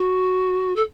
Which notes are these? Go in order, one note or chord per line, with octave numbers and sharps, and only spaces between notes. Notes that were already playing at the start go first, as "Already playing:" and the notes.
Already playing: F#4
A4